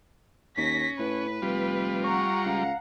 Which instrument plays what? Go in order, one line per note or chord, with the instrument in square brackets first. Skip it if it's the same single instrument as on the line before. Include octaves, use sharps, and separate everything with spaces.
[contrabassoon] D#2 [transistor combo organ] C#4 [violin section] A#6 B6
[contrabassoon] A2 [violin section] B4
[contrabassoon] F1 [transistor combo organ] G3 F4
[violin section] F#5 A#5 [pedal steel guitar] C#6
[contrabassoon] C#2 [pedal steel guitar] F5